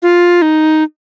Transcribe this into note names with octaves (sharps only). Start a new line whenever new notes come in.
F4
D#4